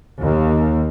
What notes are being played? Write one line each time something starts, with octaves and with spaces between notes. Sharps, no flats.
D#2